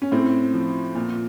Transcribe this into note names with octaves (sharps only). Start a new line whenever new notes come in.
C#4
A2 C4
F3
A#2